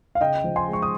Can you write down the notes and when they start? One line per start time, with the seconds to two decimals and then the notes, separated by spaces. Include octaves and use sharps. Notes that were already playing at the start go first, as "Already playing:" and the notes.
0.15 F5
0.21 C#3 D#5 G5
0.44 F3
0.56 G#5 C6
0.68 G#3
0.73 C#6
0.82 D#6